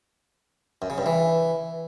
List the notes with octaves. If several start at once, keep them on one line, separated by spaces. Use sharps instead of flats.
F#2
C#3
G2
E3